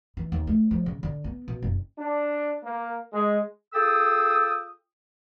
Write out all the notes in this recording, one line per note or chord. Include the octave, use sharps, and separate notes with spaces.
E3
D#2
A3
F3
C#3
D3
B3
B2
F#1
D4
A#3
G#3
F4 G#4 A4 G5 D#6 E6